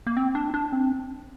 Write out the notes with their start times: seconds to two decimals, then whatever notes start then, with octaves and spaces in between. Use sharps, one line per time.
0.07 A#3
0.17 C4
0.35 D4
0.54 D4
0.72 C4